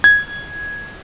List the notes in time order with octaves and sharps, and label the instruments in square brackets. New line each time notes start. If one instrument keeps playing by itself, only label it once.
[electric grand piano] G#6